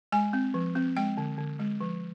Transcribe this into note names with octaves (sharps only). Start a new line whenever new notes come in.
G#3 G#5
C4
F3
C4
G#3 G5
D3
D3
G#3
F3